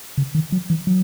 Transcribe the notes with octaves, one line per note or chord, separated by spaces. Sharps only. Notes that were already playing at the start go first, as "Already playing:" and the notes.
C#3
D#3
F#3
E3
F#3